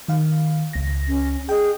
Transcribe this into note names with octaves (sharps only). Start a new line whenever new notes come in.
D#3 F5
C#2 A#6
C#4
G#4 D#5 G5